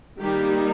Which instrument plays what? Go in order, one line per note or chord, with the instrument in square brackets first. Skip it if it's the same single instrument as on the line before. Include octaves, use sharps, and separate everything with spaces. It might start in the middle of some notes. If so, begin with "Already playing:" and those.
[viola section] D#3 G3 A#3 D#4 G4